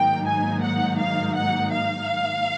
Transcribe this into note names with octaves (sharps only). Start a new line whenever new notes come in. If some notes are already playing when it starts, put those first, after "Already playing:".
Already playing: G#2 D#3 F#3 A#3 D#4 G5
G#5
F#5
F5
F#5
F5